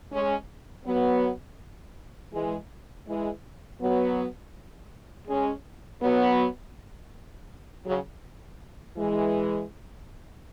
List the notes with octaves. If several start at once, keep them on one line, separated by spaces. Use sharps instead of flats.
G#3 C#4
F#3 B3
E3 G#3
E3 G#3
F#3 B3
G#3 C#4
F#3 B3
C#3 F#3
E3 G#3